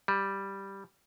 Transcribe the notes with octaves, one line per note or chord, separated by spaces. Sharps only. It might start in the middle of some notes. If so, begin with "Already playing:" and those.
G3